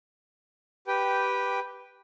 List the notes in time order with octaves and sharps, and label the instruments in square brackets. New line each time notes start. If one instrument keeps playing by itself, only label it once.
[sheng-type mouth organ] G4 B4 G5